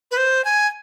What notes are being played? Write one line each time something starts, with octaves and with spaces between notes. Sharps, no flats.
B4
C5
G#5